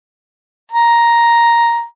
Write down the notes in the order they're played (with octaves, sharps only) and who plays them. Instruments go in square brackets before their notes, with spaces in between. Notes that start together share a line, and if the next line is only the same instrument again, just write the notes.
[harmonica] A#5